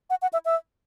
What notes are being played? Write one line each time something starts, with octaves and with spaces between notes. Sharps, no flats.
F#5
F#5
E5
E5